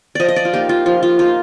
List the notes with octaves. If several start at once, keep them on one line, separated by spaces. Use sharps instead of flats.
F3 D5 D#5
D#5
D5
F4
A#3 D#4 G4
F4
F3 F4
F4
A#3 D#4 F4